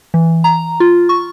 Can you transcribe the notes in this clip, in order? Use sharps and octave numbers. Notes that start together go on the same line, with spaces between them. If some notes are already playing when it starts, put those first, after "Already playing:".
E3
A#5
F4
C#6